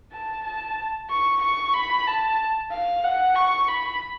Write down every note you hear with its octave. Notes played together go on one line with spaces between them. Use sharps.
A5
A5
C#6
C#6
B5
A5
F5
F#5
C#6
B5